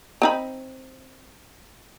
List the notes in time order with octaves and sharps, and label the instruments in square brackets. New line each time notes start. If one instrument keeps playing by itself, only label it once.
[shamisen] C4 D#4 B5